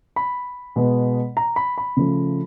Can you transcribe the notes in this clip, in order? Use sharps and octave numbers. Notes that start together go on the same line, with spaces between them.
B5
B2 G#3 B3
A#5
B5
B5
C#3 F3 A3